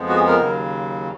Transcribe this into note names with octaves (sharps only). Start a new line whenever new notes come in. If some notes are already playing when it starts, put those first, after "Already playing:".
Already playing: F2 F3 G#3 B3
F#4
G#4
A#4
D#2 C#3 F#3